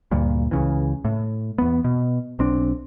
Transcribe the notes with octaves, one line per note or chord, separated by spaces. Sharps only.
D2 G2 A#2
C#2 C#3 E3
A2
E2 B3
B2
B1 C4 D4